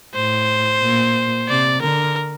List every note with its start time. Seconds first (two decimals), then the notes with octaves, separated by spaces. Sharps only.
0.15 A2 C5
0.82 A#2
1.49 C3 D5
1.82 D3 A#4